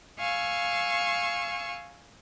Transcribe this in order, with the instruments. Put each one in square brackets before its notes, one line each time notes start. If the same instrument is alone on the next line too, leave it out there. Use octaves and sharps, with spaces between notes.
[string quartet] F5 G#5 C#6 E6